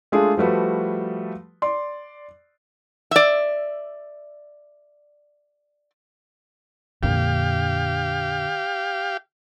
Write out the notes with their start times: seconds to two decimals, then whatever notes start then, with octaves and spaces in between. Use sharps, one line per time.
0.12 G#3 A3 D4 F4 G#4
0.37 F3 G3 A3 F#4 B4
1.62 D5 C6
3.11 D5 E5
7.03 F2 A#2 D3 A#3 G4 F5